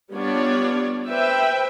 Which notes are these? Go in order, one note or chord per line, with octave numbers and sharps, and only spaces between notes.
G3 B3 D4 F4 C#5 D5
B4 C5 E5 G5